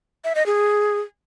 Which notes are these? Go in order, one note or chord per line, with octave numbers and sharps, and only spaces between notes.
E5
D#5
G#4